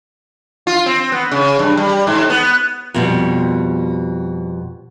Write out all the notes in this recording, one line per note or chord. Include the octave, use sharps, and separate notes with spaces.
F4
C4
B3
C#3
G2
G3
G#2
B3
F2 B2 G3